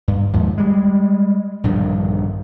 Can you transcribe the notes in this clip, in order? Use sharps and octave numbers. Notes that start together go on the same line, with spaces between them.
G2
D#2 G#2 F3
G3 G#3
A#1 G2 D3 D#3